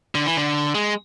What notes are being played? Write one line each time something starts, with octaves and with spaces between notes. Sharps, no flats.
D3
E3
D3
G#3